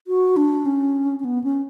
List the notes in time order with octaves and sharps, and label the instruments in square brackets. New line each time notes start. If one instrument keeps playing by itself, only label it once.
[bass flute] F#4
D4
C#4
C#4
B3
C#4